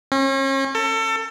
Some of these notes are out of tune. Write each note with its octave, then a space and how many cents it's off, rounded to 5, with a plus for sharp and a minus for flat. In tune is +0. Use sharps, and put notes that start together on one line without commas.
C#4 -40
A4 +30